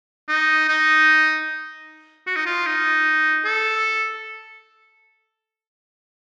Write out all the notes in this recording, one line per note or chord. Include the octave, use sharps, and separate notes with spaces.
D#4
D#4
F#4
D#4
F4
D#4
A4